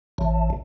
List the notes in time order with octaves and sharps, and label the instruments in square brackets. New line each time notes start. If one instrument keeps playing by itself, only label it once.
[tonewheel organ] A1